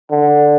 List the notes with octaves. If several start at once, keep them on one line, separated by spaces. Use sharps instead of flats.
D3